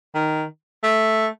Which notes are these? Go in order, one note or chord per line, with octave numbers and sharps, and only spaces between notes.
D#3
A3